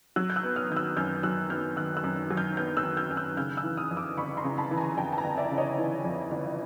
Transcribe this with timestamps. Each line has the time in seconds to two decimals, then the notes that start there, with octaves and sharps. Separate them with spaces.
0.16 F#3 E6 F#6
0.30 G6
0.36 E6 F#6
0.43 B3
0.56 D#6 F6
0.70 D#3 G6
0.76 E6 F#6
0.97 F#2 F6 G6
1.23 F#3 E6 F#6
1.50 B3 F6 G6
1.77 D#3 E6 F#6
1.97 E6 F#6
2.04 F#2
2.30 F#3
2.37 F6 G6
2.57 B3 F6 G6
2.77 E6 F#6
2.84 D#3
2.97 F6 G6
3.11 F#2 F6
3.17 E6 F#6
3.37 C#3 F6 G6
3.57 E6 F#6
3.64 E3
3.77 D#6 F6
3.91 F2
3.97 D6 E6
4.17 G1 B5 C#6
4.37 A#5 C6
4.44 C#3
4.57 A5 B5
4.71 E3
4.77 G#5 A#5
4.97 F2 G5 A5
5.13 A5
5.18 G#5 A#5
5.24 G1
5.38 D5 E5
5.51 C#3
5.58 C#5 D#5
5.78 E3
6.05 F2
6.31 G1